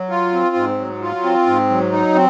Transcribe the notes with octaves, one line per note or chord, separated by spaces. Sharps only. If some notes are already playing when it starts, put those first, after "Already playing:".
Already playing: F#3
F4
C4
G#2
F#3
F4
C4
G#2
F#3
D#4
C4